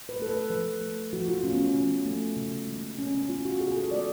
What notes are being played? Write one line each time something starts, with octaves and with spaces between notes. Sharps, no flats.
B4
A3 A4
B4
F3 B4
A3
F3 F#4
F4
A3 C#4
B3
C#4
F3 C#4
A3
C#3
G#3 B3
C#3 C#4
C#4
G#3 B3 F4
F#4
C#3 G#4
G#4
A4
G#3 B3 D5